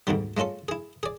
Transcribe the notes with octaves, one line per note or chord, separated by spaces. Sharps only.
D2 G#2 B2 D3 G3
G#3 A3 C#4 F4 A4
E4 G#4
G#4 D5